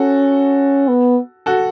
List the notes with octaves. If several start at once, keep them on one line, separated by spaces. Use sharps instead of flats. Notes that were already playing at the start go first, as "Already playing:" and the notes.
Already playing: C#4 F#4 A4
B3
F#4 A4